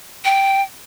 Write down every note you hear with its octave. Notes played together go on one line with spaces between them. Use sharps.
G5